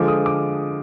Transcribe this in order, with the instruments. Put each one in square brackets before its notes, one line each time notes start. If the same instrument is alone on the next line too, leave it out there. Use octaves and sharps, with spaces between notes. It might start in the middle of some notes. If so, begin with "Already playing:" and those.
Already playing: [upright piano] D3 F3 G#3 D6
D#6
D6